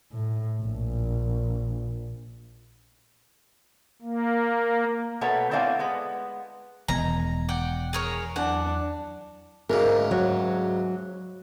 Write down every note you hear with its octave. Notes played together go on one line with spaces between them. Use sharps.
A2
A#1
A#3
B2 A3 B4 C#5 A#5
B3 C4 E4 D5 F5 G#5
G#3 B3
E1 E2 B2 D#3 E3 G#3 A#5
D5 F#5 G5
G#4 A#4 C#5
E2 F#3 D4 F#5
D2 G#2 C#3 A#4
F#3